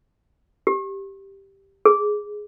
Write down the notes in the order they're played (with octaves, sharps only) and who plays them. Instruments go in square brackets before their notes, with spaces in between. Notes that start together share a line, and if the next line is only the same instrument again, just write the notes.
[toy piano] G4
G#4